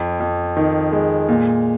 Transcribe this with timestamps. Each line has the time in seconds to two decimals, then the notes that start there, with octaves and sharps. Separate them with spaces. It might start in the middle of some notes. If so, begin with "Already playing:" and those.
Already playing: F2
0.20 F2
0.57 D#3
0.92 G#3
1.29 A#2